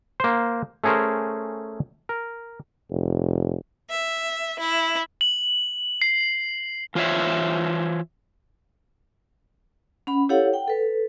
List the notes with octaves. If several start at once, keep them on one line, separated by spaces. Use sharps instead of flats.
A#3 C5
A3 C#4 G#4 A#4 C5
A#4
F1
E5
E4
F#7
C7
E3 F4 C5 C#5 E5
C#4 F#5 B5
E4 G4 A4 C#5 F5 F#5
F#5 G5
A4 B4